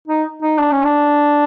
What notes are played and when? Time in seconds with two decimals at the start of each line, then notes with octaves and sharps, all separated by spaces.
0.08 D#4
0.43 D#4
0.59 D4
0.72 C#4
0.84 D4